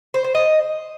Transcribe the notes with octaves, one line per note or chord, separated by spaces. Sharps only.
C5
C5
D#5